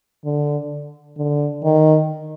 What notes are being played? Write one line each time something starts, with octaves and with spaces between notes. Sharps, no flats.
D3
D3
D#3